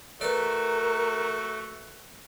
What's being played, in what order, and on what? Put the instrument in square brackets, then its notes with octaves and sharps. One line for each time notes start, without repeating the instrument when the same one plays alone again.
[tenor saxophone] A3 [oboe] F#4 [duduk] A#4 [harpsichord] B4 D5